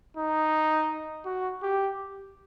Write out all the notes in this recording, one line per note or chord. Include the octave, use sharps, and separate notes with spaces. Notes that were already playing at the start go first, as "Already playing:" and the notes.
D#4
F#4
G4